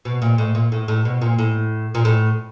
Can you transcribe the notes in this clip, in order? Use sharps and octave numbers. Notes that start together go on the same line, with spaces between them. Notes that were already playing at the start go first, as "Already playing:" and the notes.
B2
A#2
A2
A#2
A2
A2
B2
A#2
A2
A#2
A2